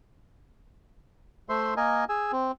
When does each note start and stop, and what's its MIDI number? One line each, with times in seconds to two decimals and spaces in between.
1.49 1.74 57
1.49 1.74 72
1.49 1.74 76
1.49 1.74 84
1.77 2.05 58
1.77 2.05 70
1.77 2.05 75
1.77 2.05 80
2.09 2.32 68
2.09 2.32 80
2.09 2.32 88
2.32 2.52 60